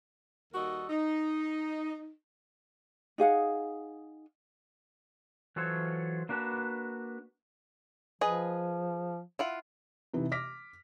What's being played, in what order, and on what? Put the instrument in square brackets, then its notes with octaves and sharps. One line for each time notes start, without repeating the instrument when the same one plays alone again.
[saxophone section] D#2 G3 F#4 A4 A#4 D#5
D#4
[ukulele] D#4 G#4 F5 F#5
[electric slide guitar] E3 F#3 F4 A4 C5 C#5
A#3 D4 F#4 B4 A5
[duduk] F3 [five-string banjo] G#4 B4 D#5
[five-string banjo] E4 F4 F#5
[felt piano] C3 E3 D#4
D6 F6 A#6 B6